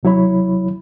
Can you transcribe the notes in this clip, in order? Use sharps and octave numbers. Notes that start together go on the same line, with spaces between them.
D#2 C3 F#3 E4 C#5 B5